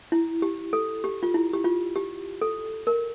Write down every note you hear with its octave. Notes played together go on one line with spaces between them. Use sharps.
E4
G4
A4
G4
F4
E4
G4
F4
G4
A4
A#4